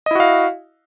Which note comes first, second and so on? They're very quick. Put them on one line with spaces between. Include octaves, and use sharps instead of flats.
D#5 E4 F#4 F5